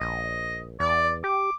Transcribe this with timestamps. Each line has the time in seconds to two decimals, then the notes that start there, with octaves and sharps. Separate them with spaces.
0.01 A#1 D#5
0.80 E2 D5
1.24 G4 D6